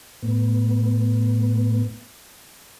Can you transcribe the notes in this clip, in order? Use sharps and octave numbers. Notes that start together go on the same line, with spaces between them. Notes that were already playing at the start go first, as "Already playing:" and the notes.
A2 B3